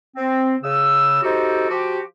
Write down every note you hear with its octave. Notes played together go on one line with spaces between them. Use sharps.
C4
C#3 E6
D#4 F#4 G4 A4 C5
F3 F#4 G4